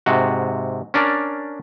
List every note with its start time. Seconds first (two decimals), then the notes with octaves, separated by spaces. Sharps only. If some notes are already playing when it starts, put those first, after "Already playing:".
0.06 G#2 C3 F#4
0.94 C#4 D4 A#4 D5